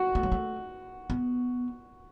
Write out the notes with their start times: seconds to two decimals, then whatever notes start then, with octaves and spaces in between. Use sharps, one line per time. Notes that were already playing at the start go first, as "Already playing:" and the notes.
Already playing: F#4
0.15 A3
0.23 F#3
0.32 A3
1.10 B3